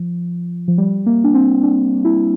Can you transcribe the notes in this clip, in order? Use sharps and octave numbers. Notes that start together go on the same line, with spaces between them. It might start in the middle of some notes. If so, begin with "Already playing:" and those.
Already playing: F3
F3
G3
A#3
D4
C4
D4
E4